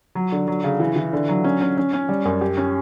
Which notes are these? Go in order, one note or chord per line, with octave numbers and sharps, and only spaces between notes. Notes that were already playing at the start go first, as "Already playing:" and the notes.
F#3
D3
F#3
C#3
E3
E3
D3
F#3
C#4
C#4
C#4
C#4
G3
F#2
G4
C#4